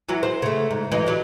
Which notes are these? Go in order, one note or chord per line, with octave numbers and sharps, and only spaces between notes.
E3 F#3 F#4
C5
C#3 A3
G#2
E3 F#3 D#4
F#3 G3